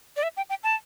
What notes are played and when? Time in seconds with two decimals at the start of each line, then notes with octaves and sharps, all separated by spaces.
0.17 D5
0.23 E5
0.37 G5
0.50 G5
0.63 A5